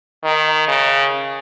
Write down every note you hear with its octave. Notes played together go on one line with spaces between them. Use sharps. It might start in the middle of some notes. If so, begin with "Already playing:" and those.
D#3
C#3